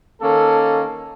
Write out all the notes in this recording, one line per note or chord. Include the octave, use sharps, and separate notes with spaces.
D#3 A#3 C#4 A4